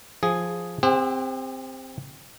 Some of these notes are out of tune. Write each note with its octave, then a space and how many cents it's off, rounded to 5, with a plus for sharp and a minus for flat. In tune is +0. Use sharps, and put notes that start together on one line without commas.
F3 +0 G#4 +0
C4 +0 G4 +45 F#5 +0